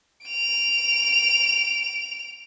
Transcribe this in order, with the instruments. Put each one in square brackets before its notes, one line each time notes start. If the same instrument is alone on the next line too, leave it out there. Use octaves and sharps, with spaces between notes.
[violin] D7 F7